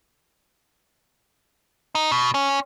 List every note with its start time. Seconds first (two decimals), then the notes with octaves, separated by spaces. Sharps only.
1.95 D#4
2.12 B2
2.34 C#4